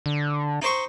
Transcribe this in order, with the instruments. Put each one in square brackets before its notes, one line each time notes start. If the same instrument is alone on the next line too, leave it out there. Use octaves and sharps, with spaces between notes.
[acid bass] D3
[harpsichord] D#4 C5 C#6